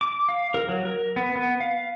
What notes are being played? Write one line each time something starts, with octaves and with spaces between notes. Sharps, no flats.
D6
F5
A#4
F#3
A#4
B3
B3
F5